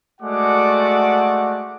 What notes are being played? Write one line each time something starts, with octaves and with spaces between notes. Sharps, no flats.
G#3 A3 F#4 D5 F#5 D6